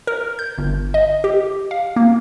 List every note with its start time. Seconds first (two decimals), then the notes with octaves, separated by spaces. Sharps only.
0.07 A#4
0.39 G6
0.58 G1
0.94 D#5
1.24 G4
1.71 F5
1.96 A#3